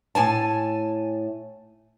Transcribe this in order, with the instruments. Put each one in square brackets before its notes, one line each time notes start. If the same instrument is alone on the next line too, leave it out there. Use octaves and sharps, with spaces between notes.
[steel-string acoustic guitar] A2 G#5 A5